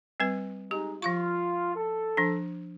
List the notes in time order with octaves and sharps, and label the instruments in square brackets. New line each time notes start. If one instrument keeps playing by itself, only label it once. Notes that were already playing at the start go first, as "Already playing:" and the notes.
[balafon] G3 C4 B4
[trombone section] G#3 D#4 [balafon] G4
[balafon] F3 F5 C#6 [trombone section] F4
[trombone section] A4
[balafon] F3 D4